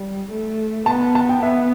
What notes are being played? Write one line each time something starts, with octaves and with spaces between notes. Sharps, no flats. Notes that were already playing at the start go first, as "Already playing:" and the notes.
Already playing: G3
A3
B3 A5
A5
G5
B3 E5